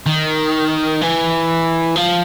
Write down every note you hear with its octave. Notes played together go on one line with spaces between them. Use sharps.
D#3
E3
F3